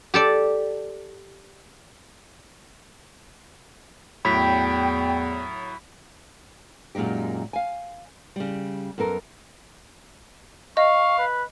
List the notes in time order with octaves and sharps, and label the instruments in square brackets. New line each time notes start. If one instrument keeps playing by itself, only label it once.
[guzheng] G4 A4 D5
[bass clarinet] E2 [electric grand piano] A2 F#3 [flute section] G5 [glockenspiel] B5 B6
[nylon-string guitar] F#2 A#2 G#3 D#4 G4
F5 G#5
C#3 G3
F#2 B3 A4 A#4
[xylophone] D#5 [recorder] F5 [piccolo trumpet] C#6
[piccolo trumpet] B4